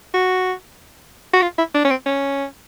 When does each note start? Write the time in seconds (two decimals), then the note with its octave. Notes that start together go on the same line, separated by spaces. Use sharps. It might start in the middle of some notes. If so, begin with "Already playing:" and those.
0.14 F#4
1.33 F#4
1.42 F4
1.58 E4
1.75 D4
1.85 C#4
1.90 C4
2.06 C#4